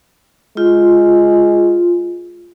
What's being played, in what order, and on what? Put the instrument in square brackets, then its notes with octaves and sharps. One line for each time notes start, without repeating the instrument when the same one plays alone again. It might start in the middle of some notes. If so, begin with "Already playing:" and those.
[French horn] G#3 [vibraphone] F4